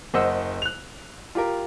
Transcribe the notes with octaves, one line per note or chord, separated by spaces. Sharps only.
F#1 C5 D#5 F#5 E6
F#6 F7
F4 G4 A#4